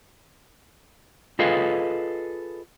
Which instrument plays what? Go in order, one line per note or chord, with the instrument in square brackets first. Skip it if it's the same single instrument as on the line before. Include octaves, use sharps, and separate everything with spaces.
[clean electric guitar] F4 G#4 A4 B4 D#5 F5